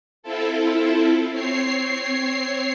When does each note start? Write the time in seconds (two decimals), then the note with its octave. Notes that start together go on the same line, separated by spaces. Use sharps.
0.23 C4 E4 F4 A4
1.31 C4 C#5 C7